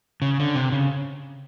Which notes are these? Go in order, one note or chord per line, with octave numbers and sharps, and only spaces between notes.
C#3
D3
C3
C#3